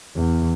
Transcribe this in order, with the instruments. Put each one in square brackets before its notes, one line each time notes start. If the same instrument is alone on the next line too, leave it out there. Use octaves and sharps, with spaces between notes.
[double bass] E2